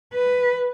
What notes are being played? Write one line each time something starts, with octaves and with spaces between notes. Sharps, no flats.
B4